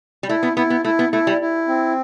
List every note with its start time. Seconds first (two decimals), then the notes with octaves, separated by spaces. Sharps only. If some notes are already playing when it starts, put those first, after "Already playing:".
0.23 G3
0.29 A3 E4
0.43 B3
0.57 B3 E4
0.70 B3
0.84 A3 E4
0.99 B3
1.12 A3 E4
1.27 G3
1.41 E4
1.68 C4